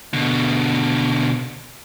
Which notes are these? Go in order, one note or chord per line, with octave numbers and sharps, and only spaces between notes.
B2 D3